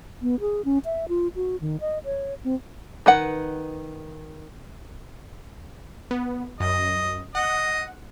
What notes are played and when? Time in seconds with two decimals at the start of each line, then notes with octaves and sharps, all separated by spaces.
0.22 B3
0.40 G#4
0.65 C#4
0.85 E5
1.09 F4
1.36 F#4
1.61 D#3
1.81 D#5
2.05 C#5
2.44 C4
3.06 D#3 B4 F#5
6.11 B3
6.60 F#2 D#5
7.35 D#5 F#5